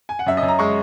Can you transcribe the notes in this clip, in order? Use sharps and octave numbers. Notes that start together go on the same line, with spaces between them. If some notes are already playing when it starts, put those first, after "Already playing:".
G#5
F#5
F#2 E5
D#5
F#2
A#5
G#3 C#6